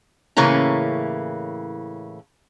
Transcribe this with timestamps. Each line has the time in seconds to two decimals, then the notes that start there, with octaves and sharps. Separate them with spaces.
0.37 A2 C#3 E3 A#3 C#4 A#5